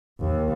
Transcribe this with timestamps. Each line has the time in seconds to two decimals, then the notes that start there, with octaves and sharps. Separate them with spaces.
0.21 D#2